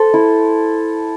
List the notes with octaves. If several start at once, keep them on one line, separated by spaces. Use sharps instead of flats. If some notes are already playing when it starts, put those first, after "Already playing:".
Already playing: A4 C5
E4